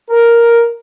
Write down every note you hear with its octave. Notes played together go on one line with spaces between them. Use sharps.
A#4